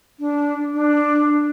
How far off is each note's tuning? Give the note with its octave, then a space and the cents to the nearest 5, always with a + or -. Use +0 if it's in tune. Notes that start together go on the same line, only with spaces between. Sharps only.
D4 -15
D4 +10